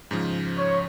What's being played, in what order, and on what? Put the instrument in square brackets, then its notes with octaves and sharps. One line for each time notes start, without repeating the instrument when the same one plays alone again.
[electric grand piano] G#2 C#3 F3
[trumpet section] C#5